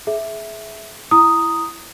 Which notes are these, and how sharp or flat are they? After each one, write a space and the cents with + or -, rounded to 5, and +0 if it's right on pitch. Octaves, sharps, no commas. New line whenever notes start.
G#4 +25 E5 +0
E4 +15 A#5 +0 D#6 +0